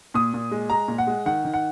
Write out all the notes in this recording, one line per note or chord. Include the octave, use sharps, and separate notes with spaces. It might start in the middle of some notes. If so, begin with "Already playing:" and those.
A#2 D#6
A#2
G#3
G#3 A#5
A#2
F#5
G#3
D#3 F#5
D#3
F#5